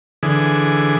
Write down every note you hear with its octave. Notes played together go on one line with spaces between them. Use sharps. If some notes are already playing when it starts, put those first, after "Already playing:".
D3 E3 G#4